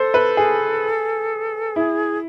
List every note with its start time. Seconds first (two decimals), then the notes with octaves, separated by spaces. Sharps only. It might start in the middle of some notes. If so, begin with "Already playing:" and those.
Already playing: A4 C5
0.14 B4
0.37 G#4
1.76 E4 G#4